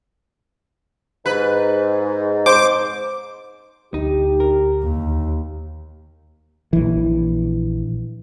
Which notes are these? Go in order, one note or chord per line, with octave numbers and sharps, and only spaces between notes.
G#2 B4
C5 D6
D2 D#4 G4
A#4
D#2
A#1 E3